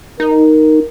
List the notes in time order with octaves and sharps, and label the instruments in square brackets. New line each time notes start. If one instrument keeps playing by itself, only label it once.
[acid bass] D#4 [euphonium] A#4